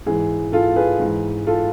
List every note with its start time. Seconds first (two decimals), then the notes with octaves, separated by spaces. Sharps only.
0.06 G#2 E3 G#4
0.52 F4 A4
0.76 G#4 B4
1.00 G#2 E3
1.47 F4 A4